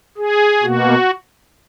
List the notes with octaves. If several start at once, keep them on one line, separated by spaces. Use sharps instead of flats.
G#4
B2 A#3 F#4